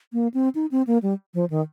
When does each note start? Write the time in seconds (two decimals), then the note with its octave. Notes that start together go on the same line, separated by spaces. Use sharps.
0.13 A#3
0.34 C4
0.55 D#4
0.71 C4
0.87 A#3
1.02 G3
1.34 F3
1.50 D#3